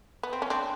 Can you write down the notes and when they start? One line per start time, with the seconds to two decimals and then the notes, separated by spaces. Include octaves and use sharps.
0.23 B3
0.33 C4
0.42 C#4
0.50 C4 D4